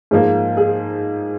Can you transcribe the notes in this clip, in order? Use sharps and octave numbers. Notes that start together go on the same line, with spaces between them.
G#2 F3 A#3
G#4